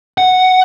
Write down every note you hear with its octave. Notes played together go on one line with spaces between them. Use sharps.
F#5